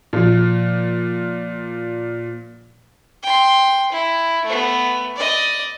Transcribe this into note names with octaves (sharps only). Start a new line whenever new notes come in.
A#2 F3
G5 C6
E4
A3 B3
D5 D#5